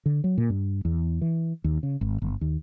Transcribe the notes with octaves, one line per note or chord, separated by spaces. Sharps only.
D3
F#3
A#2
G2
E2
E3
D#2
C#3
G#1
G1
D#2